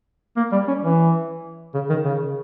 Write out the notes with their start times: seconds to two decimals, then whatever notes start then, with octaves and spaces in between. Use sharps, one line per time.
0.37 A#3
0.52 G3
0.68 C#4
0.83 E3
1.74 C#3
1.89 D#3
2.04 C#3